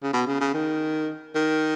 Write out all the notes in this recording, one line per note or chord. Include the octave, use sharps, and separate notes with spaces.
C#3
B2
C#3
C#3
D#3
D#3